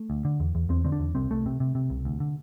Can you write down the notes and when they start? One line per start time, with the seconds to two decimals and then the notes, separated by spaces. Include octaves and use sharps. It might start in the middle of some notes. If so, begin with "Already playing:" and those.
Already playing: A3
0.10 D2
0.25 D3
0.40 E2
0.55 E2
0.69 E2 C4
0.84 D3 C4
0.92 D4
1.00 E2
1.15 C2 C4
1.30 C2 A3
1.46 C3
1.60 C3
1.75 C3
1.90 C2
2.05 D2
2.20 D3